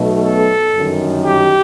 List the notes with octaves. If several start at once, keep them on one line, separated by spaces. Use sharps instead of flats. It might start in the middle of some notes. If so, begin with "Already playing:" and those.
Already playing: B1 B2 A3
A4
G1 F#2 D#3
G4